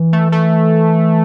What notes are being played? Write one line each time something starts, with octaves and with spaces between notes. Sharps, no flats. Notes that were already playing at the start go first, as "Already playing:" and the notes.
Already playing: E3
A3
A3